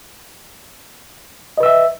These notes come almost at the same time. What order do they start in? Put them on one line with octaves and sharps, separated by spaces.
D#5 B4 E6 E5